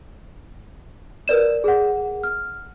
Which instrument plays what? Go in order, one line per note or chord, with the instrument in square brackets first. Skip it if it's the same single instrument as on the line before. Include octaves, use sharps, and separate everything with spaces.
[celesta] A#4 B4 D5 E7
G#4 F#5
F6